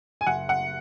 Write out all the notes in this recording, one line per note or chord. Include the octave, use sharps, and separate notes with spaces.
G#5
F#1 F#5
F#5